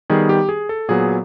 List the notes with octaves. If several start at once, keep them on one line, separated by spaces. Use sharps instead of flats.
D#3 G3 B3 G#4
G4
G#4
A4
A#2 F#3 B3 G#4